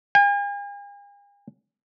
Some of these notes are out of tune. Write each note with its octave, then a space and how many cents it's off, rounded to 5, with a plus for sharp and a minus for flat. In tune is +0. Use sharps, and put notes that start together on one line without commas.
G#5 -45